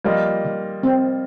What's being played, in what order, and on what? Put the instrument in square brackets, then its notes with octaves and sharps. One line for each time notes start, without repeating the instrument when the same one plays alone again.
[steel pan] F3 [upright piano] G3 A#3 F4 D#5
[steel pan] D#3
C4